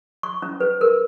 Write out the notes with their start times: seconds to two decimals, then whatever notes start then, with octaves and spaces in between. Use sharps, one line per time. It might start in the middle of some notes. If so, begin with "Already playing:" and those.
0.23 C#6
0.42 C#4
0.60 B4
0.81 A#4